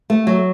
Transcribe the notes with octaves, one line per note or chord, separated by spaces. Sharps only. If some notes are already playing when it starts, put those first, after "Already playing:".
A3
F#3